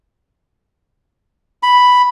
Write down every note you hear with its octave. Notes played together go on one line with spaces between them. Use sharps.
B5